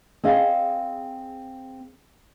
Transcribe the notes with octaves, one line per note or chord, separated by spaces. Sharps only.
C4 G#4 D#5 F5